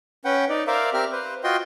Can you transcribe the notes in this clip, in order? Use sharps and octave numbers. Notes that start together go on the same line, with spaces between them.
C#4 B4 F#5 G5
D#4 D5
A#4 C5 D5 E5 F5
C4 G4 A#4 E5 F6
B4 C5
F4 F#4 D#5 G5 C6